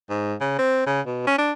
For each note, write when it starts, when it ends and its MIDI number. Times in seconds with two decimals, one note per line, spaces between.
0.10 0.35 44
0.41 0.56 49
0.59 0.86 60
0.87 1.01 49
1.07 1.24 47
1.27 1.38 61
1.38 1.52 62